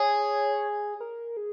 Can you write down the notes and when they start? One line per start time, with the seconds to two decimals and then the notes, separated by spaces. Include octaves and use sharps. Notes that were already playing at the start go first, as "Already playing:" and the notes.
Already playing: G#4 C#5
1.00 A#4
1.37 G#4